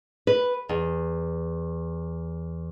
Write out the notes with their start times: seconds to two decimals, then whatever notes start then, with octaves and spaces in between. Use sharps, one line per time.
0.27 B4
0.69 E2